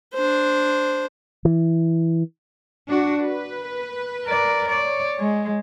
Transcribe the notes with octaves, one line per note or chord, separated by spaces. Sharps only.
D4 C5
E3
D4 F#4
B4
A#4 D5
C#5 D5
G#3